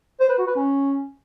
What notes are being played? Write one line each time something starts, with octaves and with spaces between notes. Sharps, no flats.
C5
B4
F#4
B4
C#4